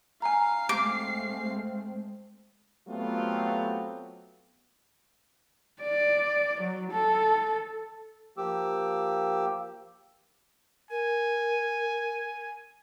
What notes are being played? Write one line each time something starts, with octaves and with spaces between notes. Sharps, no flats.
F5 G#5 A#5 C7
G#3 A3 C4 D6
F#3 A3 B3 C4 F4 G4
D5
F#3
A4
F3 A#3 G4 D6 E6
A#4 G#5